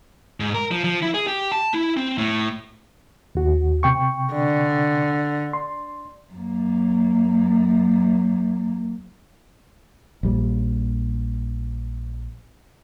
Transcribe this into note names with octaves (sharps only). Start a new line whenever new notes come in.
G#2
A#4
F3
F3
E4
G#4
G4
A5
E4
C4
A2
D#2 F#4
C3 G5 C#6
D3
C6
F#2 A#3
A#1 G3